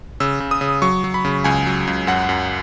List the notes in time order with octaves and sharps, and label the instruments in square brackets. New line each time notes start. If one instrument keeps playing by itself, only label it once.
[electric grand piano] C#3 E6
C#3
D#6
C#3
F#3 C#6
F#3
B5
C#3
C#2 G#5
F#3
C#2
F#2 F#5
F#2